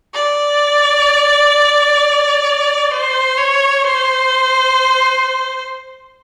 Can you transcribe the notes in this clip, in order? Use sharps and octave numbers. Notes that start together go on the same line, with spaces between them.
D5
C5
C#5
C5